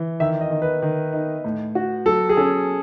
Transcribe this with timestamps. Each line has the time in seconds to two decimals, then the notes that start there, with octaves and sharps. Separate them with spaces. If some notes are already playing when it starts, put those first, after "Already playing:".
Already playing: E3
0.20 D#3 E5
0.41 D#5
0.51 D#3
0.62 B4
0.82 D#3
1.13 D#4
1.44 A2
1.75 F#4
2.06 F#3 A4
2.29 G#4
2.37 C#4 A4